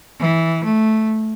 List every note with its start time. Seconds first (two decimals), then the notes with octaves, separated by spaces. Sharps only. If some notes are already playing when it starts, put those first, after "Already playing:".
0.20 E3
0.64 A3